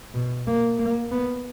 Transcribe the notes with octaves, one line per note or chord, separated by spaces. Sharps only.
B2
A#3
A#3
B3